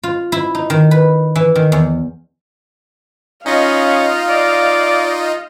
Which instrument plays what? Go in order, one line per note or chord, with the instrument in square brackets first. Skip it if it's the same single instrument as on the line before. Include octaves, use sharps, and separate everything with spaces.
[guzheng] F4
E4
D#4
D#3
B4
E3
D#3
E2
[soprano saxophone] C#4 [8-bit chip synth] D#4 F4 [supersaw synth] D#5 [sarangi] F5
[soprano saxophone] D5